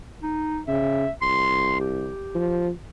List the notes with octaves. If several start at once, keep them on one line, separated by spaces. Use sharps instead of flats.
D#4
C#3 E5
C2 C6
G4
F3